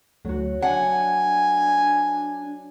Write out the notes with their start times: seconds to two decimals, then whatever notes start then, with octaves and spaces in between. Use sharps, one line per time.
0.25 D2 F#3 F#4
0.62 D4 F#5 G#5